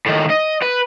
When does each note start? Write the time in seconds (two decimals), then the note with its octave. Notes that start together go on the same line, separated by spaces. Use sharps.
0.06 A2 D#3
0.30 D#5
0.62 B4